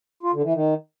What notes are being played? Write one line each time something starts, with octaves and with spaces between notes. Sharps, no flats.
F4
D3
E3
D#3